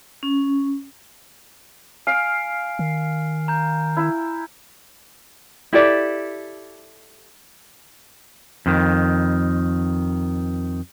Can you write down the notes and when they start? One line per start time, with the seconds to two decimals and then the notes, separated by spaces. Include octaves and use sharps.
0.23 C#4
2.07 F5 G#5 F6 D7
2.79 D#3
3.48 A#5 G6
3.97 E4
5.73 E4 G4 A4 D5
8.66 F2 D#3